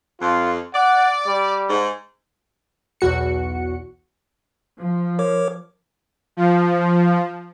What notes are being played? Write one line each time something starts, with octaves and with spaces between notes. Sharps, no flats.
F2 F4
D5 F#5
G3
G#2
B1 E2 F#4 C#7
F3
A#4 C#5 D6
F3